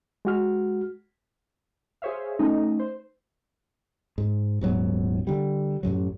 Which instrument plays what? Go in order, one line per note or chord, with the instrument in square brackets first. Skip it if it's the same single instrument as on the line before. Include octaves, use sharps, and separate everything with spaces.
[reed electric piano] G#3 F#4 F6
[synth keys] G#4 C5 C#5 E5 F5
A3 C#4 D#4
C5
[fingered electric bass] G#2
D#1 G#2 F#3 B3
D3 G3
A1 F#2 C3 F#3